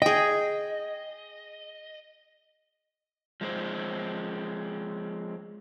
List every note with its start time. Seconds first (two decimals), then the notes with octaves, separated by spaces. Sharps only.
0.02 G#4 D#5 G5
3.41 F3 G#3 A3 C4